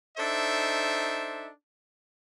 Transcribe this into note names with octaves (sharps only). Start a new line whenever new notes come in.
D4 D#4 A4 C5 E5